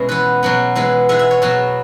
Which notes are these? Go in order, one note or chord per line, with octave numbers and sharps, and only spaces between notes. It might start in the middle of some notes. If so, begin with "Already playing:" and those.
Already playing: B2 G#3 C#4 E4
E3 B3 B4
B2 F#3 B3
E3 G#3 B3
E3 G#3 B3 E5
E5
C#5
B2 F#3 B3